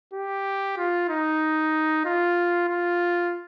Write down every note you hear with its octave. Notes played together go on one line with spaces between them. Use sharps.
G4
F4
D#4
F4
F4